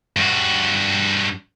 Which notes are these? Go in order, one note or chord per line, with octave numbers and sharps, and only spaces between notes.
G2 F#4